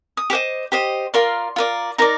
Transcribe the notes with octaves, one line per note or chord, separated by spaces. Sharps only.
D#6
G4 C5 D#5 D6
G4 C5 D#5
F4 A#4 D5 C6
F4 A#4 D5
D#4 A#4 D5 A#5